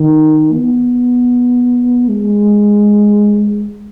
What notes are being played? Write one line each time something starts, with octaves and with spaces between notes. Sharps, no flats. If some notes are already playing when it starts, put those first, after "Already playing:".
Already playing: D#3
B3
G#3